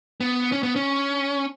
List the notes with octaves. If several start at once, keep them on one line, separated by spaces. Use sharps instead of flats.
B3
C#4
B3
C#4